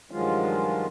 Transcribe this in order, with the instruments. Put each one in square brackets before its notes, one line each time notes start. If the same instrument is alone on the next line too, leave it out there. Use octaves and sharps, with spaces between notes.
[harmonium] G2 D#3 F3 F#3 G#3 F4